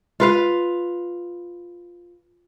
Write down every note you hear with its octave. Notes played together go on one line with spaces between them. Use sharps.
F4 B4 F5